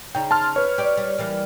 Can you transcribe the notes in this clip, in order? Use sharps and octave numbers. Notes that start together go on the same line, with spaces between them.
C#3 D#4 G5
A5 C6 F6
B4 C#5
G4 D5
G3
E3 G3 A#3